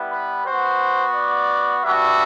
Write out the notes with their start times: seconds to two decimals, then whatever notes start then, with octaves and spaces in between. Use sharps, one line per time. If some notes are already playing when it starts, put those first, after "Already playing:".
Already playing: G3 B3 E4
0.11 B4
0.45 B3 F#4 C5
1.15 D5
1.84 G3 B3 D4 F#4 E5